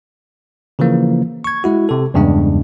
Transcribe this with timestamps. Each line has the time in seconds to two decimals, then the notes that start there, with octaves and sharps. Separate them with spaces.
0.79 C#3 E3 F3 A#3
1.44 C#6 G#6
1.64 G#3 E4 F#4
1.89 C3 A4
2.14 E2 G2 C#3 G#3 D4